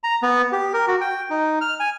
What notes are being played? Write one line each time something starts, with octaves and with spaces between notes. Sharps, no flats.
A#5
B3
G4
A#4
F#4
G5
D#4
F6
G#5